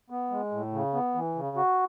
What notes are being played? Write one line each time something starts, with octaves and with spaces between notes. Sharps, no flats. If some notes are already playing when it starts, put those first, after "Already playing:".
B3
G#3
A2
C#3
B3
E3
C#3
F#4